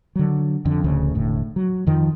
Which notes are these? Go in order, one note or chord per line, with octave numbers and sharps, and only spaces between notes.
D3 F#3
F2 D3
D1 D2 C#3
E1 A2 D3
F#3
F2 D#3 F3